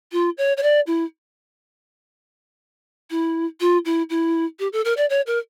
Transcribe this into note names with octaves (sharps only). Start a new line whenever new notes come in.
F4
C#5
C#5
D5
E4
E4
F4
E4
E4
G4
A4
A#4
D5
C#5
A#4